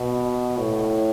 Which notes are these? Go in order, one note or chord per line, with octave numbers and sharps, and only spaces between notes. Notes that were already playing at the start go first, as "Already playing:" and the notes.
Already playing: B2
A2